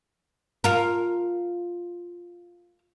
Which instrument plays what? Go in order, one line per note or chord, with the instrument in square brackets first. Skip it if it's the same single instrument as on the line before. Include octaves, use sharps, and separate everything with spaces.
[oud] F4 A#4